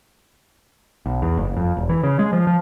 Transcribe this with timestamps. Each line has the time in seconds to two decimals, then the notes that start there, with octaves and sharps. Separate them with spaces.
1.06 B1
1.22 E2
1.38 F#1
1.57 F2
1.77 E1
1.89 E3
2.03 C#3
2.19 G#3
2.33 F3
2.47 F3